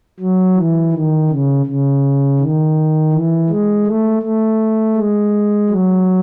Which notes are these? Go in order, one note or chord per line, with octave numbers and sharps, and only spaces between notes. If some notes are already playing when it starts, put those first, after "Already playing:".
F#3
E3
D#3
C#3
C#3
D#3
E3
G#3
A3
A3
G#3
F#3